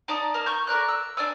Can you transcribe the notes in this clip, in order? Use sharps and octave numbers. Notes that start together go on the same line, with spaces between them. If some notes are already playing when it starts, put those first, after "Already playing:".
D#4 D5 A5 D#6
A#3 A#4
C#6 G6
A3 A#4 D5 F#6
E6
D4 D5 G#5 E6